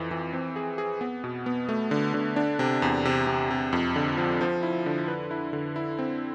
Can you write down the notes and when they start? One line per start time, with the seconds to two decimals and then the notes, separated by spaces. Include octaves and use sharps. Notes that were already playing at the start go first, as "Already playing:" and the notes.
Already playing: F2 E3
0.11 E3
0.33 C4
0.56 G#4
0.78 G#4
1.01 B3
1.24 B2
1.46 B3
1.69 A3
1.91 D3
2.14 D3
2.36 D4
2.59 C3
2.82 E2
3.05 C3
3.27 C3
3.51 C3
3.73 F2
3.96 D3
4.17 F3
4.41 F3
4.63 E4
4.86 D3
5.08 B4
5.31 E4
5.53 D3
5.76 E4
5.99 C4